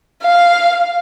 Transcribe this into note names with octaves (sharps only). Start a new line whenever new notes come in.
F5